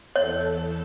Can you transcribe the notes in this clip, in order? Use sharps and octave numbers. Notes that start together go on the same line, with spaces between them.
E2 A4 C#5